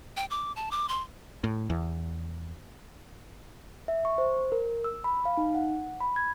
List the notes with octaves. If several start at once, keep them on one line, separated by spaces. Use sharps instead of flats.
G5
D6
A5
D6
C6
A2
E2
E5
C#6
C5
A#4
E6
B5
F5
D#4
F#5
B5
G#6